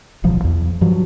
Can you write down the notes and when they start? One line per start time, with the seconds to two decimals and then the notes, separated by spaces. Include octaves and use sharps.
0.24 D1 B1 F3
0.44 E2
0.81 G2 F3 F#3